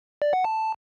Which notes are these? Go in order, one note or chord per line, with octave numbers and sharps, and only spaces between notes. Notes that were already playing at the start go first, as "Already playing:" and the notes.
D5
F#5
A5